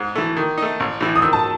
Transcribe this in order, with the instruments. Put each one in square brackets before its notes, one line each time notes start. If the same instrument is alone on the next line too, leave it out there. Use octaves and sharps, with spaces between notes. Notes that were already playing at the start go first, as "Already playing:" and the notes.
Already playing: [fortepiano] G#2 [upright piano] D#6
[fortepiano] E3 A3
D#3
A3 D#4
A1
A2 E3
[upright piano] D#6
[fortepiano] D#3 [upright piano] E6
[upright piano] A5